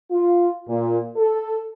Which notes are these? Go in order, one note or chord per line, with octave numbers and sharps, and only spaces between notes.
F4
A#2
A4